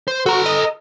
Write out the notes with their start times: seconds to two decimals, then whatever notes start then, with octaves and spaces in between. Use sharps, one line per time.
0.08 C5
0.26 F#4 A4 A#5
0.46 D#5